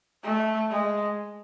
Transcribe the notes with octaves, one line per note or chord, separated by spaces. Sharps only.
A3
G#3